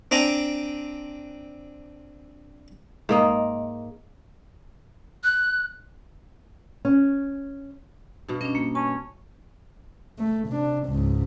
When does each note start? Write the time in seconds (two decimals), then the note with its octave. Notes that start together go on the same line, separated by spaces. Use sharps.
0.11 C4 D4 G#5 A#5
3.09 G#2 A#3 D#5
5.24 F#6
6.85 C#4
8.28 G2 B2
8.41 C#4 D4 D#5
8.55 A#3
8.75 C#4 A5
10.19 A3
10.49 C3 D4
10.87 C#2 G#2